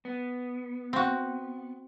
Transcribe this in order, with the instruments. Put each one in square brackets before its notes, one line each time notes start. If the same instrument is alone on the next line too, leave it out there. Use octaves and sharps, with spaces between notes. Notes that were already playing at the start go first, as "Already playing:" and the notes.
[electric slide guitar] B3
[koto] C4 F#4